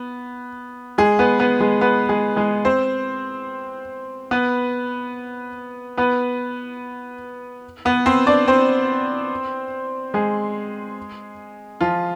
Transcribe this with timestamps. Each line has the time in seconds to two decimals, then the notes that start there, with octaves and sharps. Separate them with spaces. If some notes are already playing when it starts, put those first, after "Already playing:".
Already playing: B3
0.98 G#3 G#4
1.19 B3 B4
1.39 B3 B4
1.60 G#3 G#4
1.81 B3 B4
2.09 G#3 G#4
2.36 G#3 G#4
2.65 C4 C5
4.31 B3 B4
5.97 B3 B4
7.85 B3 B4
8.06 C4 C5
8.27 D4 D5
8.48 C4 C5
10.14 G#3 G#4
11.81 F3 F4